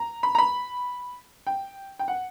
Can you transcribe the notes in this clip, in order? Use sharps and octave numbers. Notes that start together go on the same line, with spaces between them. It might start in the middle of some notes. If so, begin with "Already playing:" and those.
Already playing: A#5
B5
A#5
B5
G5
G5
F#5